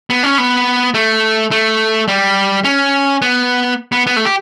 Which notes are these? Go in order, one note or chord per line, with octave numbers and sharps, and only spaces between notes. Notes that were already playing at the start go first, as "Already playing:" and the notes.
B3
C#4
B3
A3
A3
G3
C#4
B3
B3
B3
A3
G4